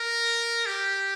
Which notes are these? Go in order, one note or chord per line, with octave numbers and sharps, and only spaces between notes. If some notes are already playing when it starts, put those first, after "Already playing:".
Already playing: A#4
G4